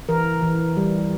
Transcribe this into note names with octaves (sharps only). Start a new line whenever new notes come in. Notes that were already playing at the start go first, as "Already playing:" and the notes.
E3 A#4
E3
G3